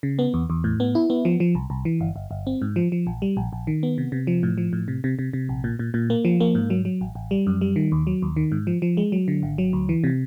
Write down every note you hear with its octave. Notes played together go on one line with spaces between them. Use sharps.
C#3
B3
E2
E2
A2
B3
E4
B3
F3
F3
C2
C2
E3
G1
G1
G1
C4
G#2
F3
F3
A#1
G3
A#1
A#1
D#3
B3
C3
C3
F3
A2
F3
A2
C3
C3
C3
C3
A#1
A#2
A#2
A#2
A#3
F3
A#3
G#2
F#3
F#3
A1
A1
G3
F#2
G3
D#3
D#2
F#3
D#2
D#3
G#2
F3
F3
G#3
F#3
D3
G#1
F#3
D2
E3
C3